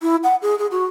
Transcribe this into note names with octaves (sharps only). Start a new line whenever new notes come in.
E4
F#5
G#4
G#4
F#4